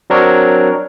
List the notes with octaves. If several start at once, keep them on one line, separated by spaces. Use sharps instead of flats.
F#3 C4 D4 A#4 C#5